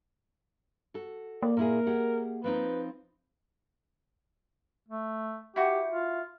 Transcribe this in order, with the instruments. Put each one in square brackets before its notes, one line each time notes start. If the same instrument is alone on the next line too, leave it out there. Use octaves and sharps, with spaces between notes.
[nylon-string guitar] F#4 A4
[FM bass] A#3 [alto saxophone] D5
[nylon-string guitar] A#2 E4 G#4 [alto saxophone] A#4
[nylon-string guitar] G4 G#4 F#5
[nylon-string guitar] F3 C4 D#4 [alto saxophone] B4
[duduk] A3
[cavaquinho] E4 F#4 [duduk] G4
[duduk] F4